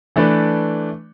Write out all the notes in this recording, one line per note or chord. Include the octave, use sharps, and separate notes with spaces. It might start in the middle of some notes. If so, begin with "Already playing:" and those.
E3 A3 D4 B4 D5